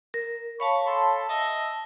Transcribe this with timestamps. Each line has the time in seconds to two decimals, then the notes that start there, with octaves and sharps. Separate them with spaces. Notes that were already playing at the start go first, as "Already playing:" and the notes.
0.14 A#4
0.60 C#5 F5 A5 B5 C#6
0.86 A4 B5 C6
1.29 D#5 E5 A5